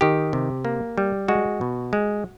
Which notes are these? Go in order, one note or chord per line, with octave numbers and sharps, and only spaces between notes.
D#3 G4
C3
A#3
G3
G#3 F#4
B2
G#3